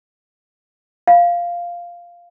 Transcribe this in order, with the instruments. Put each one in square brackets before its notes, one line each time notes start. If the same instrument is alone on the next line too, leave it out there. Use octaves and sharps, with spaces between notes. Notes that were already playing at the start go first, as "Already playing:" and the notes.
[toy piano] F5